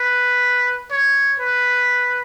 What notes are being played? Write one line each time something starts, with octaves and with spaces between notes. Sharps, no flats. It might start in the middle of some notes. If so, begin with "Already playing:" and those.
Already playing: B4
C#5
B4